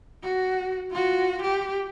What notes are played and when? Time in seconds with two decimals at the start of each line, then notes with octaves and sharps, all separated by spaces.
0.23 F#4
0.91 F4 F#4
1.42 G4